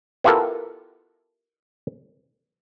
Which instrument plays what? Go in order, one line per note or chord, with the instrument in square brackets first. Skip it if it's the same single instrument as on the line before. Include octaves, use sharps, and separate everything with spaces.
[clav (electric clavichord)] B3 E4 F4 G4 A4 A#4